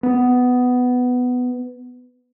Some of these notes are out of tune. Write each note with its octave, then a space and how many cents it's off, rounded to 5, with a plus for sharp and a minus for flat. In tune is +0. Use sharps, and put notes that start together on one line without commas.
B3 +10